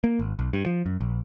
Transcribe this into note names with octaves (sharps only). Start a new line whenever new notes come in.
A#3
G#1
B1
G2
F3
F#2
A#1